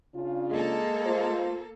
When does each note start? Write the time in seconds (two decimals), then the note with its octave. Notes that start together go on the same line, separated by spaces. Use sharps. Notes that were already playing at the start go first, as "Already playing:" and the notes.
0.15 C#3 D4 F4
0.51 G#3 A#3 A4
1.05 F4 C5